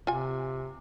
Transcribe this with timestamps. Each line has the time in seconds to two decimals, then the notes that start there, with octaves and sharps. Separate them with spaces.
0.07 C3 F4 G#5